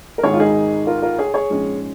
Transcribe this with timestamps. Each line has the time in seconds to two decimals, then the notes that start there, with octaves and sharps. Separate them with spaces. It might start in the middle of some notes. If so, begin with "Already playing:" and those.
0.18 A#4
0.23 G#1 G#2 D#3 G#4 C#5
0.33 F4
0.39 D#4 G#4
0.87 F4 A#4
1.02 F4 A#4
1.18 G#4 C#5
1.34 G#4 C#5
1.50 A#1 G#2 G#3 C#4